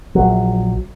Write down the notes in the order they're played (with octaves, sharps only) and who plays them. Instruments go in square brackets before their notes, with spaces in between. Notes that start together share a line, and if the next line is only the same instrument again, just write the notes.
[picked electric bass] A#1 F#3